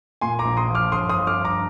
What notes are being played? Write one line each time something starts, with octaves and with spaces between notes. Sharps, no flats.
A#2 G#5 C6
A#5 D6
A#1
C6 D#6
F3
D6 F6
G1 C6 D#6
C6 D#6
F3
D6 F6
G2
A#5 D6